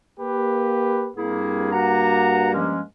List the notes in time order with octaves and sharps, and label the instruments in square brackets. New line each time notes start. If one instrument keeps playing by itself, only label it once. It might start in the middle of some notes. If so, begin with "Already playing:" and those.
[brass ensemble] A#3 G4 B4
[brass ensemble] G2 A#3 [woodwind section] C4 E4 G#4
[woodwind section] F#4 F#5 A#5
F3 G#3 C#4